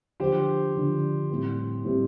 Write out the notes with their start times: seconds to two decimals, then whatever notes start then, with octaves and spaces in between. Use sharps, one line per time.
0.20 D3 F3 D4 G4 C5
0.75 D3 F3 D4
1.30 A2 G3 C4 G4
1.84 A2 G3 C4 G4